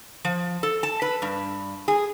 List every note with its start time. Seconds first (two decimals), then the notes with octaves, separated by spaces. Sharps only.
0.25 F3
0.63 A4
0.83 A5
1.02 B4
1.22 G2
1.88 G#4